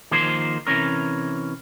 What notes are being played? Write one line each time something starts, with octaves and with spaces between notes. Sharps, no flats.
D#3 F3 A#3 G#4 C5
C3 E3 C#4 A#4